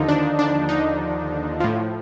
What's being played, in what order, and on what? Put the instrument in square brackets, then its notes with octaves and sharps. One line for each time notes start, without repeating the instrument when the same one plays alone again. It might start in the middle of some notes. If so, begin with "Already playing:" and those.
Already playing: [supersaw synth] D#2 D3 F3 D#4
D4
D4
D#4
A2 F3